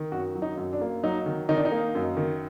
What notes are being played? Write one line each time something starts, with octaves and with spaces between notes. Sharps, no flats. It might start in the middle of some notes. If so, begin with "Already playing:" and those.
Already playing: D#3
F#2 F#4
F#3
D#4
F#2
D4
A#3
F#3 D#4
D#3
D#3 D#4
D4
D#4
A#3
F#2
D#3